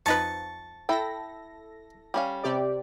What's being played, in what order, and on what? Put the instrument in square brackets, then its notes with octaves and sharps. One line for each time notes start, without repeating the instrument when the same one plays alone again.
[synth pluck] F2 D#4 B4 [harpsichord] A5 C#6
[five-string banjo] E4 G5 [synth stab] A4 A#6
[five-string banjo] G3 C#4 F5
[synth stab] C3 G4 D5